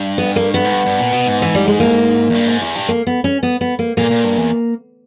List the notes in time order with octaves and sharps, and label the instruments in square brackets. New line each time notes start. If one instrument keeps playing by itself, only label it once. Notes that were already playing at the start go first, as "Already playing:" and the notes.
Already playing: [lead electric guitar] G2
[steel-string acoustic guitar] B3
A#3
B3
[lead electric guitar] G#2
G2
G2
A#2
B2
G#2
[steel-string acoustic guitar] E3
G3
G#3
A#3
[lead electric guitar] E2
G2
G#2
E2
G2
[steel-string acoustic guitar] A#3
B3
C#4
B3
B3
A#3
[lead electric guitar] A#2 [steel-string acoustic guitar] A#3
[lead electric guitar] A#2
G2
E2